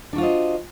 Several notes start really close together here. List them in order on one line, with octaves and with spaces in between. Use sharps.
D4 F#4 F4 C5 D#5